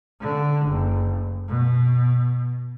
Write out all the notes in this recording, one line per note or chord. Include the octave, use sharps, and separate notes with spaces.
D3
F#1
B2